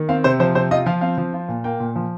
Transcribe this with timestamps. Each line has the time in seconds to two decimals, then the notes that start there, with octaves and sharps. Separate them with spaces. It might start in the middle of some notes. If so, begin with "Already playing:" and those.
Already playing: D#3
0.09 C4 F5
0.24 C3 C5
0.40 F3 C5
0.55 C3 C5
0.71 F4 D#5
0.86 F3 F5
1.01 C4 F5
1.17 F3
1.34 F4
1.48 A#2
1.64 A#3 G5
1.80 A#2
1.95 F3